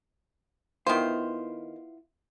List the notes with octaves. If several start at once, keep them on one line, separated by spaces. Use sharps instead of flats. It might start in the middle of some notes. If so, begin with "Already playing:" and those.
D#3 B3 E4 F4 C5